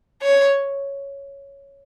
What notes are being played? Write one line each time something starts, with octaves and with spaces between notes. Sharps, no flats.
C#5